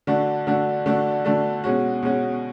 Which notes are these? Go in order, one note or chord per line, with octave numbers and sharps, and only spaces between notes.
D3 A3 D4 F#4
D3 A3 D4 F#4
D3 A3 D4 F#4
D3 A3 D4 F#4
B2 G#3 C#4 F#4
B2 G#3 C#4 F#4